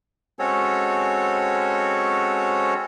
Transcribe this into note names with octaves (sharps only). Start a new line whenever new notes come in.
G#3 C4 C#4 F#4 A4 C#5